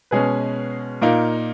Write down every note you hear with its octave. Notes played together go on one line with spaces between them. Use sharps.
B2 G#3 C#4 G#4 B4
A#2 A#3 D#4 A#4